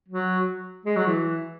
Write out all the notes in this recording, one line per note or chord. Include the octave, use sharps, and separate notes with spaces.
F#3
G#3
F#3
E3